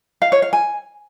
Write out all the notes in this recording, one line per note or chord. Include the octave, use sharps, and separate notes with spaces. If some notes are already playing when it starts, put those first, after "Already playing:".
F5
C#5
F5
G#5